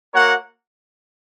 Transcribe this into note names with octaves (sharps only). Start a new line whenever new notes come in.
A#3 F#4 A#4 C#5 F#5